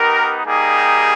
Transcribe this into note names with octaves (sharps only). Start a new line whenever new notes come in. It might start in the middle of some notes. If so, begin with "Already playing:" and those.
Already playing: B3 D#4 G4 A#4
G3 A#3 D#4 G4 G#4